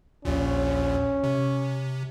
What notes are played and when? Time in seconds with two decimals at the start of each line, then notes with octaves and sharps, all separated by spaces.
0.25 A#1 D#2 A#2 C#4
1.23 C3